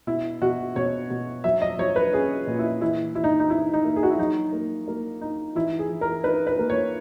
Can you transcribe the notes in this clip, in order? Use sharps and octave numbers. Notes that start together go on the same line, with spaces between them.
B2 E4
B2 F#4
B2 C#5
B2
F#3 E5
D#5
F#3 C#5
B4
C#4 G#4
A#2
E4
E3 E4
E3 E4
D#4
D#4
D#4 E4
D#4
A#3
G#4
F#4
E4
F#3 D#4
A#3
A#3
D#4
E3 E4
G#4
E3
A#4
D#4 B4
B4
A#3
C#5